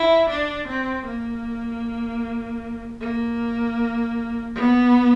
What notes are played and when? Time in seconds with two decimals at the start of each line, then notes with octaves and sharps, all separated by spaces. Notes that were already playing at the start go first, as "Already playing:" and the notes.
Already playing: E4
0.29 D4
0.68 C4
1.06 A#3
3.00 A#3
4.55 B3